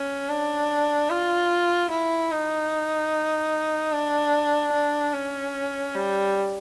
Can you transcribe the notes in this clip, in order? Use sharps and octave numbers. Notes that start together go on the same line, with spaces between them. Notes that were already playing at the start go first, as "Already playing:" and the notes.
Already playing: C#4
D4
F4
E4
D#4
D4
D4
C#4
G3